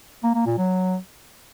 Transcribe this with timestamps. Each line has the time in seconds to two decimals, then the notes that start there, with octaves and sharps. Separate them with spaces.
0.24 A#3
0.35 A#3
0.46 A#2
0.58 F#3